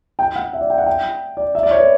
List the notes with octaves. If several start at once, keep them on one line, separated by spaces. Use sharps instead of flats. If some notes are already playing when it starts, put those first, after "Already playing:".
G5
F#5
E5
D5
G5
F#5
G5
D5
E5
D5
C#5
B4